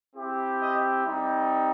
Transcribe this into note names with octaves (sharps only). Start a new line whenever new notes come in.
C4 E4 G4
D#5
G3 C4 D#4